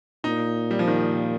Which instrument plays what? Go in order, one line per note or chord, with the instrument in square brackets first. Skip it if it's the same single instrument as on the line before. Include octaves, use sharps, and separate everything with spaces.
[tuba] A#2 [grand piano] D#4
[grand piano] G3
F3
D#3